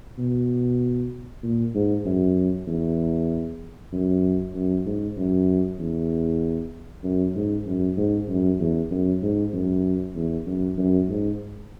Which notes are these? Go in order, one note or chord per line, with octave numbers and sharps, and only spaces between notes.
B2
A#2
G#2
F#2
E2
F#2
F#2
G#2
F#2
E2
F#2
G#2
F#2
G#2
F#2
E2
F#2
G#2
F#2
E2
F#2
F#2
G#2